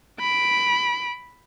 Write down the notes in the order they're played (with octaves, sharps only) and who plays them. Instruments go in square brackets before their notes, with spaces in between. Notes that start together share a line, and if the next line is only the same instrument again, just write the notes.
[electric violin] B5 D7